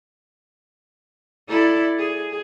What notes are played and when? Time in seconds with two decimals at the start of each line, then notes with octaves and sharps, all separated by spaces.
1.48 E4 A4 D5
1.98 G#4